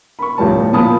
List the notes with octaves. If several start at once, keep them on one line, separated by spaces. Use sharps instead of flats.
B5 C#6
D2 A2 F3 G3 C#4 A5
A#2 F3 A5 B5 D#6